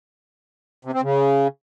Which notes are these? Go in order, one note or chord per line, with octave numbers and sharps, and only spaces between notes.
C3
C4
C#3